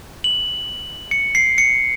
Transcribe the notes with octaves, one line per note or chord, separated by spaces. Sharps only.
F#7
C#7
C7
C#7